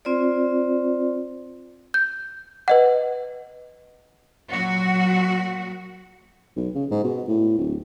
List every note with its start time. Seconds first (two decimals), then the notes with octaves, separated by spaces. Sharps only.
0.05 C4 F4 C5 D5
1.94 G6
2.68 B4 D#5 F#5
4.53 A#2 F#3 F#4
6.56 B1
6.75 C#3
6.91 G#2
7.04 B2
7.28 A2
7.58 D1